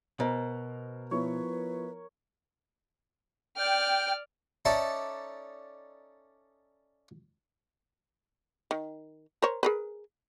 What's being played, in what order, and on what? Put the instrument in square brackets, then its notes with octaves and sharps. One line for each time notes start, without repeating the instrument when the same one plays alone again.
[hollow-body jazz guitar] B2 [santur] A#4 [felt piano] C5 D#5
[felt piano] F3 B3 E4 [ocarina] B4 [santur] C#5
[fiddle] D5 F6 [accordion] G5
[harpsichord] C#4 D#4 A4 D5 E5
[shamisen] D#3
A#4 C5 C#5
G#4 A#4 B4